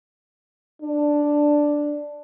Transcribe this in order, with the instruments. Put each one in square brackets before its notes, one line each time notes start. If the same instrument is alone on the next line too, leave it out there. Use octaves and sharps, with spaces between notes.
[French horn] D4